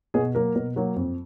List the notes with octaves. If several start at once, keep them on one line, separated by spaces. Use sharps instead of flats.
B2 G#4
F#3 A#3 A#4
B2
F#3 A#3
F2